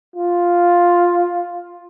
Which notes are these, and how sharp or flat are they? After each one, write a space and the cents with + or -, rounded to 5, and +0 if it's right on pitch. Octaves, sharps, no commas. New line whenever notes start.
F4 +5